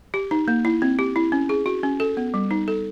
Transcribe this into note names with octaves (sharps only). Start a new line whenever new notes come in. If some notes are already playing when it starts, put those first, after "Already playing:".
G4
D#4
A#3
E4
C4
G4
E4
C#4
G#4
F#4
C#4
A4
B3
G3
D#4
A4